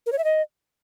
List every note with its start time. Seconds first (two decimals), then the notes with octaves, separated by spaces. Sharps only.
0.06 A#4
0.12 C#5
0.18 E5
0.24 D#5